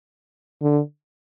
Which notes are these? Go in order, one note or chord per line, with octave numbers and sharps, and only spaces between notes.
D3